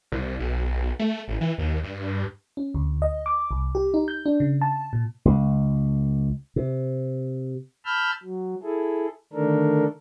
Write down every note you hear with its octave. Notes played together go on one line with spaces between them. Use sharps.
C2
B1
A3
A1
E3
D#2
G2
C#4
D2
D#5
D6
C2
G4
D#4
G6
D4
C#3
A5
A#2
C#2
C3
A5 B5 E6 F6 G6
F#3
E4 G#4 A4
D3 D#3 A3 D4 A4 A#4